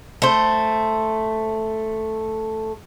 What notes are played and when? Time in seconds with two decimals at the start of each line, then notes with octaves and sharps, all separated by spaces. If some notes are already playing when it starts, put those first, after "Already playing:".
0.22 A3 C5